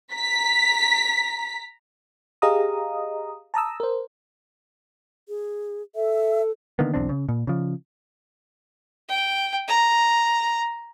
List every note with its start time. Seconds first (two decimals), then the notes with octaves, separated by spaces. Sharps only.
0.13 A#5 B6
2.42 G4 G#4 D#5 F5 A#5 D#6
3.54 A5 A#5 D#6 E6
3.80 A#4 C5
5.29 G#4
5.95 A4 E5
6.79 D3 D#3 A#3 B3
6.94 B1 E2 C4 D4
7.09 C#3
7.29 A#2
7.47 C#3 F3
9.09 G5
9.68 A#5